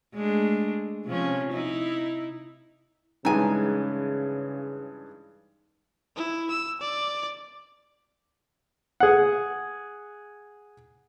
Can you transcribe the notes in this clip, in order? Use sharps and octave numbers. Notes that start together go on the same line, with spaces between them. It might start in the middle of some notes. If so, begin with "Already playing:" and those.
G#3 A3 D4
C3 F3 C#4
D#4 E4
G2 C#3 E3 G#3 D#4 G#5
E4
E6
D5
G#4 F#5